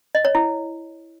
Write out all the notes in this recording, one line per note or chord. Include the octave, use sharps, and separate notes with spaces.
D#5
C#5
E4